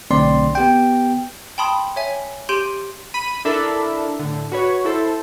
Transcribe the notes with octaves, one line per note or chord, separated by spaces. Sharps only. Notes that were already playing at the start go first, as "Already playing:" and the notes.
B1 D3 A3 C4 D5 C6
B3 G4 G5
G5 A5 B5 C6 D#6
C#5 E5 G#5
G4 C6 G6 D7 D#7 F#7
B5 D#7
D4 E4 A4 A#4 E5 B5
A2 D3
F#4 B4 C#5
E4 A4 C5